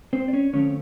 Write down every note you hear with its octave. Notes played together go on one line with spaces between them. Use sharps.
C4 C5
D5
C#4 C#5
D3 F3 A3 C4 C#4 C#5